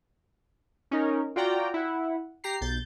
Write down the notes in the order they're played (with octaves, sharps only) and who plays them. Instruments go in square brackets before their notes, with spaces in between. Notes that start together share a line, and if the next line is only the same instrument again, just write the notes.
[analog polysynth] C#4 D#4 A#4
F4 F#4 D5 G5 A#5
E4 F#5
G4 A#5 C7
B1 G6 A6